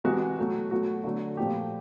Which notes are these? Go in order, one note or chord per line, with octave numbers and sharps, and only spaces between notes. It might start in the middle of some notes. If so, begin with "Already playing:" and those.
C3 E3 G#3 F#4
B2 F#3 A3
B2 F#3 A3 F#4
D3 F#3 A3
A#2 F3 A3 G4